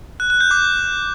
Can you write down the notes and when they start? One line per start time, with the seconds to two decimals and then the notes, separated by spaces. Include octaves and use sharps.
0.20 F#6
0.30 F#6
0.40 G6
0.51 D6